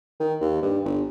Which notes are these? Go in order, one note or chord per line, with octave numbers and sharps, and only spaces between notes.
D#3
D#2
G2
G1